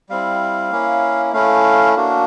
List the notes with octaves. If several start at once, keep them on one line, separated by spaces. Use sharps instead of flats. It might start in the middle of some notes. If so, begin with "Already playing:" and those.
G3 C4 E4 F5
A#3 C#4 E4
A3 C#4 E4 F5
A#3 D4 F#4